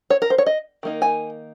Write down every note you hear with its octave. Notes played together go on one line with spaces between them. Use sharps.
C#5
A#4
C5
C#5
D#5
D#3 A#3 D#4
G#5